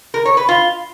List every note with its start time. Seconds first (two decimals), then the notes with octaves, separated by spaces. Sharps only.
0.14 A#4
0.25 C#5
0.37 B4
0.49 F4